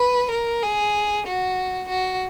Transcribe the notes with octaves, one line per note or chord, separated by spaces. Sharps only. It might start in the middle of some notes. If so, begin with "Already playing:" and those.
Already playing: B4
A#4
G#4
F#4
F#4